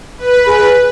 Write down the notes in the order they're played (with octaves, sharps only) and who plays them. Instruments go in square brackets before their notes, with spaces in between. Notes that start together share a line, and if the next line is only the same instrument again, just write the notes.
[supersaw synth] B4
[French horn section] G#4